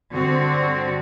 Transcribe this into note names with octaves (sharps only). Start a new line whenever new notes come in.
G2 D3 C4 F#4